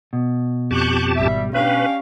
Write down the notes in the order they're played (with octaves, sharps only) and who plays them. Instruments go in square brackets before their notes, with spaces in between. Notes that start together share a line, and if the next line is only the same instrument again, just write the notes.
[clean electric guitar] B2
[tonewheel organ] F2 G4 A5 [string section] C#6 F#6 G6
[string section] G#1 G3 [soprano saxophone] E5
[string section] C#4 D4 G4 [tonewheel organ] B4 [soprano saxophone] F5